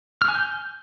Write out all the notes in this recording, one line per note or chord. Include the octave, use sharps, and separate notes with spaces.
F6
G#5
G6